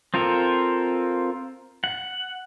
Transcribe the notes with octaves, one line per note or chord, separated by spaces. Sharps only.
C4 F4 A4 A#4
F#5